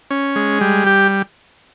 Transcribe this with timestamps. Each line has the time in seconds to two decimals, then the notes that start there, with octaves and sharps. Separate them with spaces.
0.10 C#4
0.36 G#3
0.61 G3
0.86 G4